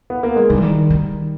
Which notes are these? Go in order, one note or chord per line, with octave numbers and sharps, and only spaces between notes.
B3
A#3
G#3
D#3 G3
E3
D#3
D#3